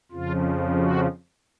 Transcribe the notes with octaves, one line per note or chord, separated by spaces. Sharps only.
F2 C#3 F3 F4
F#4